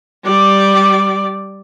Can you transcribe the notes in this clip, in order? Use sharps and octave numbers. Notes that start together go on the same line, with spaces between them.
G3 D5